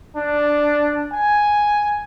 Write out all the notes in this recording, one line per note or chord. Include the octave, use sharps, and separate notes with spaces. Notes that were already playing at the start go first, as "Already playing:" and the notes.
D4
G#5